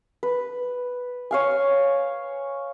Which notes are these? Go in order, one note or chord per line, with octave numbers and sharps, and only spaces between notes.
B4
C#5 F5 G#5